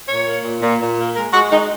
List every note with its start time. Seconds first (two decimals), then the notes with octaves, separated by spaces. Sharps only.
0.08 A#2 C#5
0.26 A#3
0.43 A#2
0.61 A#2
0.80 A#2
0.98 A#3
1.15 G#3 A#4
1.33 G#3 F#4
1.52 G#3 D#4